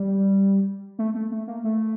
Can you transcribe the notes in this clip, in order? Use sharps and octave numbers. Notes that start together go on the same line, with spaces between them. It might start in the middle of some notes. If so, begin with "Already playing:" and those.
Already playing: G3
A3
A3
A3
A#3
A3